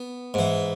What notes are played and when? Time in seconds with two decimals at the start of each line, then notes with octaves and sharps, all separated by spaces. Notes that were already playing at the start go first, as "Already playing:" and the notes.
Already playing: B3
0.34 G#2 E3